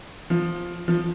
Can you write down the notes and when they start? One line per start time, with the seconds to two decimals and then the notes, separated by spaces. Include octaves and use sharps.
0.30 F3
0.88 F3